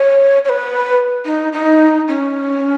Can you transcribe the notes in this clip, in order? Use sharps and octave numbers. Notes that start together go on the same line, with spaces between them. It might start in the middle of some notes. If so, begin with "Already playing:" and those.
Already playing: C#5
C#5
B4
D#4
D#4
C#4